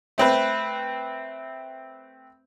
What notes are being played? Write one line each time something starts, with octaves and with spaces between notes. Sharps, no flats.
A3 C4 B4